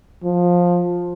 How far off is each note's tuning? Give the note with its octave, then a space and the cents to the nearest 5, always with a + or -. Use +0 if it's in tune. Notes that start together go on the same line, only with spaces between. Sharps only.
F3 +15